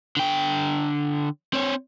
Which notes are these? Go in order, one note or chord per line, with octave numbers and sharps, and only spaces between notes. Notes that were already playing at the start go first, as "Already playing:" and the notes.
D3 G5
C4 C#5